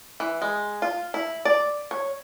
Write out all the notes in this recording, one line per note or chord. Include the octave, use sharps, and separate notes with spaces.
E3
G#3
F4
E4
D5
C#5